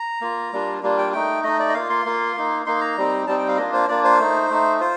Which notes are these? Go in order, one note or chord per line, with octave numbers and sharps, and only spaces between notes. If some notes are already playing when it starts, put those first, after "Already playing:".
Already playing: A#5
A#3 F4
G3 A#3 D4 F4
G3 A#3 D4 F4
G5
A3 D#4 G5
A3 D#4 D#5
D5
D#5
A#3 F4 F5
C6
A#3 F4
A#3 D#4
A#3 D#4 C6
A#5
G3 C4 D#4
G3 C4 D#4 A5
G5
F5
A#3 D4 F4 D#5
C5
A#3 D4 F4 D5
C5
A3 D#4
A3 D#4
F4 C5